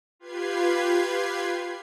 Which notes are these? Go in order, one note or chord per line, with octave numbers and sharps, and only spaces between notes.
F4 G4 B4 G#6 C7